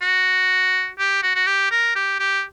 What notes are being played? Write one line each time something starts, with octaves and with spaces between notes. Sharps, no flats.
F#4
G4
F#4
F#4
G4
A#4
G4
G4